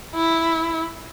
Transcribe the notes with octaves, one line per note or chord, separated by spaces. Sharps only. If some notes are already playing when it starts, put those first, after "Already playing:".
E4